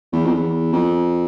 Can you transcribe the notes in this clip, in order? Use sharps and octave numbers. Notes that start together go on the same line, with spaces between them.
E2
F2
E2
F2